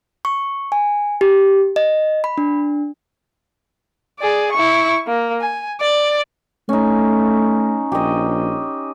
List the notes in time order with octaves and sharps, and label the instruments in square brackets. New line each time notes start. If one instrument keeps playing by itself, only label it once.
[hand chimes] C#6
G#5
G4
D#5
B5
D4
[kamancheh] G#4 D5
E4 C#6
A#3
G#5
D5
[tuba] A3 [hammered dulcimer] C#4 D#4
[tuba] A#1 [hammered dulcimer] G4 D#5